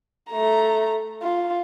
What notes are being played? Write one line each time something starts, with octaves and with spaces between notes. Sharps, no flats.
A3 A#5
F4